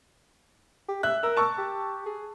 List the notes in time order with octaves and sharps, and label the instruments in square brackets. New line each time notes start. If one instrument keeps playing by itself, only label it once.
[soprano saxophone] G4
[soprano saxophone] E5 [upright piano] F#6
[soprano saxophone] A#4 [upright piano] E6
[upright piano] A5 C#6 E6
[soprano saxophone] G4
G#4